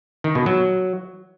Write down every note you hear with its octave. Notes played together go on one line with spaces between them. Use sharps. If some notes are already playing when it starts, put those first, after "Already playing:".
D#3
B2
F#3